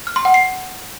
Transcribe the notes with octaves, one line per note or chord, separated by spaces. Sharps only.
F6
C6
F#5
C7